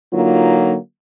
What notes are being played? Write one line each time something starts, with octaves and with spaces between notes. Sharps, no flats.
D3 F#3 A#3 D#4 F4